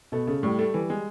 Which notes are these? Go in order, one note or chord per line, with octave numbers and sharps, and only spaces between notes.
B2 A3
C#3 A3
A2 G3
A3
E3 G3
G#3